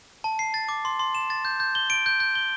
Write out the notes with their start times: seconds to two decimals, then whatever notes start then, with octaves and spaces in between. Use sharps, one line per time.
0.24 A5
0.39 C7
0.54 A6
0.69 D6
0.85 C6
0.99 C6
1.15 E7
1.30 A6
1.45 G6
1.60 G6
1.75 G7
1.90 D7
2.06 G6
2.20 G6
2.35 G7